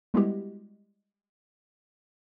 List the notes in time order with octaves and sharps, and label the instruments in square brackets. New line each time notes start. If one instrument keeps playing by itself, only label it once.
[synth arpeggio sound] G3 G#3 B3 E4 F#4 G4